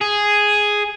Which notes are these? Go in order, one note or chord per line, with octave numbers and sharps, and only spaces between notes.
G#4